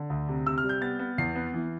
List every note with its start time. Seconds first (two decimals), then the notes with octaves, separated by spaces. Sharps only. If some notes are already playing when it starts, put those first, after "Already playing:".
Already playing: D3
0.10 D2
0.28 C3
0.46 C3 E6
0.58 F6
0.64 G3
0.69 G6
0.81 B3 A6
0.99 B3
1.18 E2 C7
1.36 B3
1.54 E3